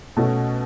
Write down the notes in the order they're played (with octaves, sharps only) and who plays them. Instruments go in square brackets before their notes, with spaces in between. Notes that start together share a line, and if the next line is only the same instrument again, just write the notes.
[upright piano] B2 A3 C#4 F#4